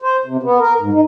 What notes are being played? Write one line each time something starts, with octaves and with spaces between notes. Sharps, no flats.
C5
C3
B3
A#4
G#2
D#4